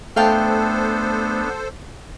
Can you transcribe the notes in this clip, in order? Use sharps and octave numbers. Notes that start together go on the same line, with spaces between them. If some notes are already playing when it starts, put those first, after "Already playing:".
A3 B3 D4 A4 C5 F5 G5 A5